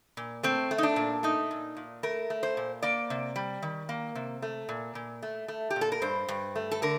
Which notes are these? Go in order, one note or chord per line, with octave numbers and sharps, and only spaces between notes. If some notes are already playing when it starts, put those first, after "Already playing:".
A#2
A3 C4
A3
D#4
D4
A#2
A3 D#4
A#2
A#2
A3 A#4
A3
C5
A#2
A#3 D5
C3
G3
D#3
A#3
C3
A3
A#2
A#2
A3
A3
G4
A#2
A4
A#4
G2 C5
G2
A3
A4
D3 A#4